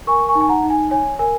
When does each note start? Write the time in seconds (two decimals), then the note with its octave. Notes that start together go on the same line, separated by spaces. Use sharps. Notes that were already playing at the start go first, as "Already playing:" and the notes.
0.07 A#4 G#5 C#6
0.29 G#5 C#6
0.35 D#4
0.41 G#5
0.49 F#5 A#5
0.63 D#4
0.70 G#5
0.91 C#5 G#5
1.19 A#4 G#5